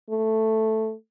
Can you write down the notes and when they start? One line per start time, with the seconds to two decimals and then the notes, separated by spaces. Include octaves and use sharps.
0.10 A3